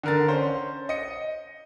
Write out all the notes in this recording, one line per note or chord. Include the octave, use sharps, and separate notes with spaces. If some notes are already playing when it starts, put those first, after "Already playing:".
D3 A#4 A6
C#4 C5
D#5 C#7